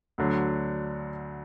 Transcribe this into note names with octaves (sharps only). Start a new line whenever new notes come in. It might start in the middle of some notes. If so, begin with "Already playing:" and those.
D2 D3 F#3